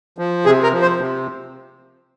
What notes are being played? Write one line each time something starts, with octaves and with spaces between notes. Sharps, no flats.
F3
C3 G#4
A#4
F3
C5
C3